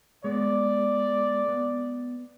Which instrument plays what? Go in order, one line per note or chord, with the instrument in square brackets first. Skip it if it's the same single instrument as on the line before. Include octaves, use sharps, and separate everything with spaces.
[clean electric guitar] G#3 B3 [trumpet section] D5
[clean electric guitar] B3